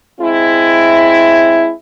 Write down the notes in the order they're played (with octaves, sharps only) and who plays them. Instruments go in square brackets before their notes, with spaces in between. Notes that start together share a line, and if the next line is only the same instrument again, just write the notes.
[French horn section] G#3 C4 E4